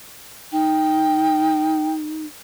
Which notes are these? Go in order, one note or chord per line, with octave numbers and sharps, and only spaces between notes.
D#4 G5